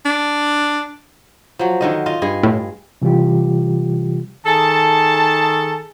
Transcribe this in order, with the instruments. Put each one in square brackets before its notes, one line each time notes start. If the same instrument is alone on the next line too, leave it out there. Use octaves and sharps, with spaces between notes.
[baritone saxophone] D4
[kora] F3 F#3
D3 D#3 D#5
F4 D#5
G2 G#4 D#5
[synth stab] A2
[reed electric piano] C3 E3 G3 F4 G4
[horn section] D#3 G#4 A4 A5